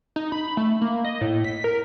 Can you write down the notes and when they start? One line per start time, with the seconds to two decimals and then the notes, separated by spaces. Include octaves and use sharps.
0.16 D#4
0.32 B5
0.57 A3
0.81 A#3
1.05 D#5
1.21 A2
1.44 B6
1.64 A#4